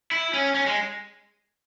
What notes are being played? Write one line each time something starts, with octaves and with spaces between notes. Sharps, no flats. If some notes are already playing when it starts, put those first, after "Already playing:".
E4
C#4
C#4
G#3